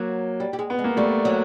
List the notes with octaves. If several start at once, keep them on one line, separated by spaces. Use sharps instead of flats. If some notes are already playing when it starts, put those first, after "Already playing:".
Already playing: F#3 A#3
G3
G3
G#3
B3
G#3
A#3
G3 A3
F#3